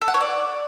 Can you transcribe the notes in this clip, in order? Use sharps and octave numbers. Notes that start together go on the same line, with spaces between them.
A4
F#5
C#5
D5